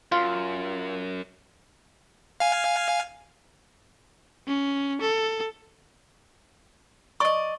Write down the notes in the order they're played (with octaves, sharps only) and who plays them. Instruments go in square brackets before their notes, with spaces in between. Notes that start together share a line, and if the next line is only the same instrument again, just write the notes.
[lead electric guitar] F#2 [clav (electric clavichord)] F4
[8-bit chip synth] F5 G#5
[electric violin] C#4
A4
[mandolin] D5 D#5 [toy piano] C#6